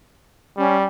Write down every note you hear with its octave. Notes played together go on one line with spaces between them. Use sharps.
G3 C#4